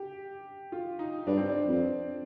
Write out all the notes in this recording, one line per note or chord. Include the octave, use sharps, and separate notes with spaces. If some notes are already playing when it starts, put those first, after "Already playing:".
Already playing: G4
F4
D#4
G2 D4
C4
D4
F2